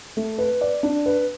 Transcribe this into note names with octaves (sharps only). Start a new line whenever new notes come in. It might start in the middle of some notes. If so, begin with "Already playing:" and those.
A3
B4
D5
D4
B4